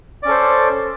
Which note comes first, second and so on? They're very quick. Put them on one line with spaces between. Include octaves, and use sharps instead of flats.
D5 C#4 A4 C5